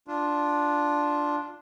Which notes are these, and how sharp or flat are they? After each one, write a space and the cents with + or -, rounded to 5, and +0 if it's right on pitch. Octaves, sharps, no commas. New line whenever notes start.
D4 +0 F4 +0